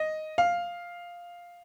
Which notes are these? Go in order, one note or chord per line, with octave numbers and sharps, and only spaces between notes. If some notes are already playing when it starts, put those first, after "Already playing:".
Already playing: D#5
F5